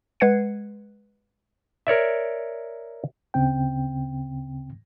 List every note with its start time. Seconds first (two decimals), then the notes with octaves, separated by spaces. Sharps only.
0.20 G#3 B4 F#5 G#6 C7 C#7
1.87 A#4 C#5 D5 E5
3.34 D2 C#3 C4 G5